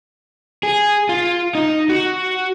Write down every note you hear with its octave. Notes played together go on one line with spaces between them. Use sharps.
G#4
F4
D#4
F#4